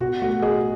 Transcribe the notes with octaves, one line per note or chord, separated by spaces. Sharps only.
B2 F#4
A3 F#4
G#4 D#5